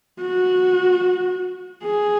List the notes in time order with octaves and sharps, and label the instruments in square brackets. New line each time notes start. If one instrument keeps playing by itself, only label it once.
[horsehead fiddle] F#4
G#4